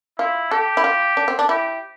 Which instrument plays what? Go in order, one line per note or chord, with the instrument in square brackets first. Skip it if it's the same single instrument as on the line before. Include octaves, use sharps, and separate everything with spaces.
[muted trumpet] E4 [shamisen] F4
[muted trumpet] G4 [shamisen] A4
[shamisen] E4
F4
D4
C4
D4
[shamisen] E4 [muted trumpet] G4